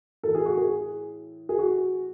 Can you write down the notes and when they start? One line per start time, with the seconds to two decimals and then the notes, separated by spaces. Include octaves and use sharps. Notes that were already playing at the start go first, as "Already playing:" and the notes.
0.23 A2 E3 A4
0.35 G#4
0.46 F#4
0.57 G#4
1.49 G#4
1.59 F#4